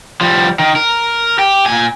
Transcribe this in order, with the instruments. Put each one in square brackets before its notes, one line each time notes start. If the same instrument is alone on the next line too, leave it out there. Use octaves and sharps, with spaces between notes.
[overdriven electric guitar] F3 G3
D#3
A#4
G4
A#2 G#5